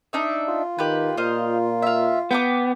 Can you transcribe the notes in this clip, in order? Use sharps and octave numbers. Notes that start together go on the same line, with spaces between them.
D4 D#4 E5
F4
D#3 G4 B4
A#2 C5 D#5 F5
E5 F5
B3 G5 A#5 D6